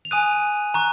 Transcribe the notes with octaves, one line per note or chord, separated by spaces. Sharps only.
F7
G#5 D#6 F#6 D#7
A#5 C#6 F#6